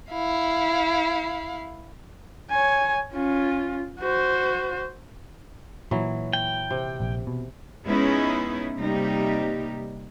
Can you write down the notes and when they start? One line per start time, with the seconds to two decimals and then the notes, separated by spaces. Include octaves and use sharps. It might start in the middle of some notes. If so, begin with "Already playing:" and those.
0.12 E4 F5
2.51 C#5 G#5
3.13 C#4 F4
4.00 F#4 C5
5.91 A#2 E3 F#3
6.33 G5
6.71 C3
7.00 A#1
7.27 B2
7.86 G#3 B3 C#4 D#4 E4 G#4
8.77 C3 G3 A#3 D#4 G4